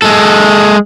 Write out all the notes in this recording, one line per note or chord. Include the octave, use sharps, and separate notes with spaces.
G#3 A4